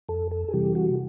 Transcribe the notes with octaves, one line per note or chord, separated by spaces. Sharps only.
F2 A4
A4
G#4
C3 E3 G3 G4
F#4